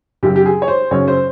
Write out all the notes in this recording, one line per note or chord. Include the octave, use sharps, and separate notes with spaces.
F#2 C#3 F#3 G4
G4
G#4
C#5
C5
F#2 C#3 F#3 C#5
C5